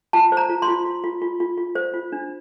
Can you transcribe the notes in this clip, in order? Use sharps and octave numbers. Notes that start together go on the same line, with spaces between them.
F4 A5
C5
A#5
F4
C6
F4
F4
F4
F4
F4
F4
C5
F4
D4